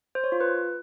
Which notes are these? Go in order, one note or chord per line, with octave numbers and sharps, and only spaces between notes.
C5
C#5
F4
B4